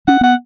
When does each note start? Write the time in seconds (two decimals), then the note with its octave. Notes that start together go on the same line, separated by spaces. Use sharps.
0.07 C#4 F#5
0.21 B3 F#5